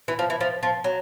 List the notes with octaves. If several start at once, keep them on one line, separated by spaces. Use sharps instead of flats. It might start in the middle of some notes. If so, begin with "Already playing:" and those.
E3
F3
E3
F3
F3
F#3